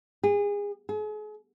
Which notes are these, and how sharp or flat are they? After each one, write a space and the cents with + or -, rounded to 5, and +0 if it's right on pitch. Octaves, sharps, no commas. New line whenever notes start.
G#4 -30
G#4 +40